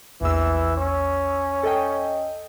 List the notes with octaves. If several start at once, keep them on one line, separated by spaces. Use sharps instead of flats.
A#1 E2 E3 E6
C#4
A4 D#5 G5